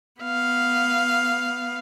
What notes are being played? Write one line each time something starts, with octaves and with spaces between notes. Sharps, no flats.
B3 F5